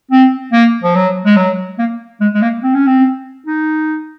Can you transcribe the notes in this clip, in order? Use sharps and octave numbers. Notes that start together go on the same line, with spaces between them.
C4
A#3
F3
F#3
G#3
F#3
A#3
G#3
G#3
A#3
C4
C#4
C4
D#4